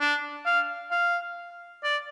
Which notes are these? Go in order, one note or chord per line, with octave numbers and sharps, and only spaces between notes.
D4
F5
F5
D5